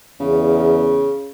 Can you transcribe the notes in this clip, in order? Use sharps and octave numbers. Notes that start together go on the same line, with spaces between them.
E2 C#3